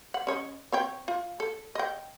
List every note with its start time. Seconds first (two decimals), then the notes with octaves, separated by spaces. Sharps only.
0.14 F#5
0.27 C#4 C#5 D#5
0.72 C4 C#5 G5
1.08 F4
1.40 A4
1.75 D#5 G5